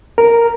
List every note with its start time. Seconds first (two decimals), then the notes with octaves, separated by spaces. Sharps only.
0.18 A#4